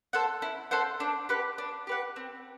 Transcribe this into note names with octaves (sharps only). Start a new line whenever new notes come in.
A4 C5 F#5
E4
A4 C5 F#5
D4
G4 B4 F#5
D4
G4 B4 F#5
C4